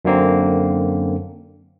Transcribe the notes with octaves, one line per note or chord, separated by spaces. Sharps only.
F#2 D3 A#3 C4